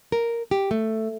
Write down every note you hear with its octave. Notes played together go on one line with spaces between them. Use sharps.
A#4
G4
A3